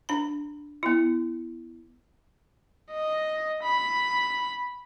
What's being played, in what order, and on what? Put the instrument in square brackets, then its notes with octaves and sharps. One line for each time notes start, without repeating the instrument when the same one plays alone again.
[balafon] D4 B5
B3 E4
[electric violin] D#5
B5